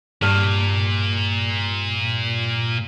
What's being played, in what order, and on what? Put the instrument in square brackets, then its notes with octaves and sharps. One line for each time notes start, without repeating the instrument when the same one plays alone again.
[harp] G2 F6 [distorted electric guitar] A#2